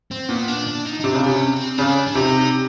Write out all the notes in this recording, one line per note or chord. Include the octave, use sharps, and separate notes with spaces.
C4
A#2 B3
D4
D4
D#4
D#4
C3 D4
C#3
C3 C#4
C4
C#3 D4
D4
C3 D#4